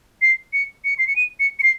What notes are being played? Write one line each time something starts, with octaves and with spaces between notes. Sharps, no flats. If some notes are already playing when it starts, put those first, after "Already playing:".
C7
C#7
C#7
C7
C#7
D#7
C#7
C#7
C7